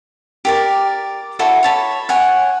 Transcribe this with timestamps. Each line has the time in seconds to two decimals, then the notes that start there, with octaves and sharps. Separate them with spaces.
0.45 G4 A#4 D5
1.39 E4 F#4 A4 C#5
1.63 C#5 A5 B5
2.09 C#5 F#5 G#5